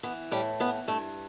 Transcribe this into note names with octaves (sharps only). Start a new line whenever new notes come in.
E3 B3
A2 G3
E3 B3
G2 A3